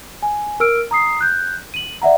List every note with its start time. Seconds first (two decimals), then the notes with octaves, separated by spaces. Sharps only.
0.23 G#5
0.60 A#4 E6 F6 D7
0.91 A#5 D#6 C7
1.21 F#6 G6
1.74 D#7 F#7
2.02 D5 E5 F#5 A#5